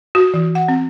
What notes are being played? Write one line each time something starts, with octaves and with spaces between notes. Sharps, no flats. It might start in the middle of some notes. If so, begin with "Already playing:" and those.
F#4
E3
F#5
C4